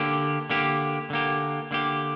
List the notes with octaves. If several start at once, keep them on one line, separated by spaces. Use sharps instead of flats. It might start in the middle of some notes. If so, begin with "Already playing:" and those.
Already playing: D3 A#3 G4
D3 A#3 G4
D3 A#3 G4
D3 A#3 G4